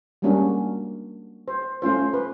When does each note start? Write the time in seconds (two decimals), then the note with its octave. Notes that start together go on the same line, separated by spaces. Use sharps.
0.22 G3 G#3 A#3 C#4 D4 F#4
1.48 C5
1.82 A3 C#4 F4 C5
2.14 B4